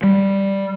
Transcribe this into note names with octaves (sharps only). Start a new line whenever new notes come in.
G3